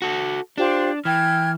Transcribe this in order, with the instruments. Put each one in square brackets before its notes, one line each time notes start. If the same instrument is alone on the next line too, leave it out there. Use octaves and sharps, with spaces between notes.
[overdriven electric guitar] F#4 A4
[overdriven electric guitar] D4 [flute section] F4 G4 C5
[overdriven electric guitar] E3 [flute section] G5 F6 G#6